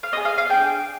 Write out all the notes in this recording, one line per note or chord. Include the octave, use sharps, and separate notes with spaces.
F5
B3 F4 G#4 D#5
F5
F5
D4 G#4 G5